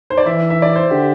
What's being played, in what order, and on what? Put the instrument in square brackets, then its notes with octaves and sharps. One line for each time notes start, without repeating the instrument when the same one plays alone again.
[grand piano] C5
D5
[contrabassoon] E3 [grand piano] E5
[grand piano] E5
D5
C5
[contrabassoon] D3 [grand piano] G4